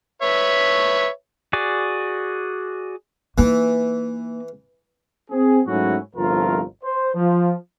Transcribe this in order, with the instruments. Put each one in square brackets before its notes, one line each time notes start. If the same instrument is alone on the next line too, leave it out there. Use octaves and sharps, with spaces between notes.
[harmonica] B4 C#5 E5
[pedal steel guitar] F#4 G#4 D5
[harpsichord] E3 [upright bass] A#3 D#4
[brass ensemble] C4 G#4
G#2 F#3 A3 C#4 E4 F#4
G1 C2 F3 A3 F4 A#4
C5
F3